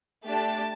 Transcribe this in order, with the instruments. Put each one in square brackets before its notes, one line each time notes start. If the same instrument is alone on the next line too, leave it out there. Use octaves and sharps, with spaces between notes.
[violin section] A3 D4 G4 A5